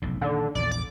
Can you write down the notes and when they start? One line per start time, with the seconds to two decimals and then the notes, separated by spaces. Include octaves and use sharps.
0.02 F1 B1 A2
0.21 A#2 D3 D#3
0.55 A#1 E2 A#2 D5
0.72 D6